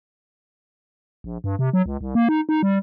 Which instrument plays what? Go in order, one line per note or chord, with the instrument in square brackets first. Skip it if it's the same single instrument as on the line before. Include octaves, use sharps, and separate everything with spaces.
[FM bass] A#1
G2
C3
F#3
C#2
C2
A#3
D#4
D#4
G3